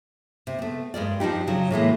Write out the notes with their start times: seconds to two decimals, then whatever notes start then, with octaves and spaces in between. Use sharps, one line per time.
0.47 C3
0.59 A3 B3
0.94 G2 G#3 A#4 D5
1.20 F3 D4 D#4 G4
1.47 C#3 F#3
1.71 A2 E3 G#3 A#3